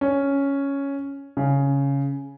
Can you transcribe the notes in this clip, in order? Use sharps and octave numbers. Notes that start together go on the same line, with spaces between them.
C#4
C#3